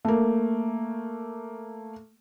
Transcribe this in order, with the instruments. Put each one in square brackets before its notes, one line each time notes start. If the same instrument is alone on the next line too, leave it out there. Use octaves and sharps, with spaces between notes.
[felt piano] A3 A#3